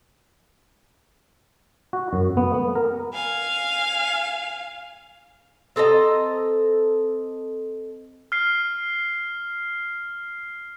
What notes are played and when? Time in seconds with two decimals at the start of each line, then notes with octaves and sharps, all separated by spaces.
1.93 F#4
2.13 F#2
2.37 B3
2.54 B3
2.75 A#4
3.13 F5 G#5
5.76 C4 A4 D#5 A#5
8.32 F6 C7